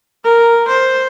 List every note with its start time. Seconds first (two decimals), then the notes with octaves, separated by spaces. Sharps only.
0.24 A#4
0.68 C5